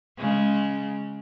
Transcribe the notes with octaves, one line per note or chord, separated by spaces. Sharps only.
C#3 G#3